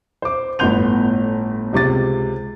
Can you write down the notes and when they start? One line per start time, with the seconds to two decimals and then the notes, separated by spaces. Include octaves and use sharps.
0.22 C5 D6
0.59 G1 A2 B3 C6 G6 F7
1.73 C#2 C3 D6 A6